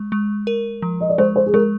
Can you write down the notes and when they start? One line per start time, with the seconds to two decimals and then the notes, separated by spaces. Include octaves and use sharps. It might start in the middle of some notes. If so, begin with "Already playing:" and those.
Already playing: G#3
0.12 G#3
0.47 A#4
0.82 F3
1.01 D#5
1.09 D5
1.18 G#3 C5
1.36 C5
1.46 G#4
1.54 G#3 A#4